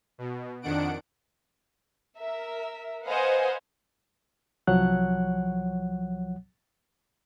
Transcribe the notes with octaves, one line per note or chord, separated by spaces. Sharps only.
B2
F2 D#3 D4 F#5 D7
A#4 E5
B4 C5 D#5 F5 F#5 G#5
C2 F3 F#3 C#5 F#5 F#6